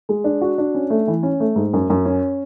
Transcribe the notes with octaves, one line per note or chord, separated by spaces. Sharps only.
G#3
D4
F#4
D4
C#4
A3
E3
C#4
A3
G#2
F#2
F#2
C#4